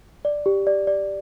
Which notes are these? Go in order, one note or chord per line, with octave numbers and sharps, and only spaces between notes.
D5
G4
D5
D5